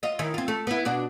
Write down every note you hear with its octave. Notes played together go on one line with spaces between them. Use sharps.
F4 D#5
D#3 E4
C4 F4
A3
B3 E4
B2 D4 F#4